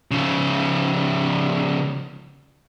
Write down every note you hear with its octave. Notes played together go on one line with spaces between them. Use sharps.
C#3 F3